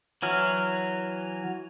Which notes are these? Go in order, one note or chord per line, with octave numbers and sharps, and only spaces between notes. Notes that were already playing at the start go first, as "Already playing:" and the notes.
E3 F#3 F6